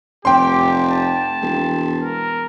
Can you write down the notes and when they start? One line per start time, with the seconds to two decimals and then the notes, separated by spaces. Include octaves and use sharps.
0.25 F1 G4 G5 C6
0.91 A5
1.42 E1
2.03 A#4